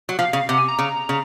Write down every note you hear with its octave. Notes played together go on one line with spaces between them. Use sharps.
F#3
F3 F5
C#3 F5
C3 F#5
G#5
A#5
C#3
C#3